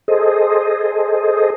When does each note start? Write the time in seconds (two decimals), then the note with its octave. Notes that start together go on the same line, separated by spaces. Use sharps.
0.08 G#4 A4 C5 D#5